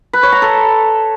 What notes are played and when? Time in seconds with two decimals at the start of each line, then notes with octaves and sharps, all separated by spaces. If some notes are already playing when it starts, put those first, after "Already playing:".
0.13 B4
0.23 C#5
0.32 A#5
0.42 A4